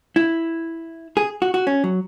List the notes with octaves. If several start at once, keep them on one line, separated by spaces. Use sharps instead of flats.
E4
G#4
F#4
F#4
C#4
F#3